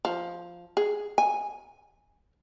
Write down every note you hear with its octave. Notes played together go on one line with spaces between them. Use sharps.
F3
G#4
G#5